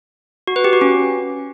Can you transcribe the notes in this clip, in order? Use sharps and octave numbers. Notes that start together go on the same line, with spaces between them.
F#4
B4
G4
F#4
C#4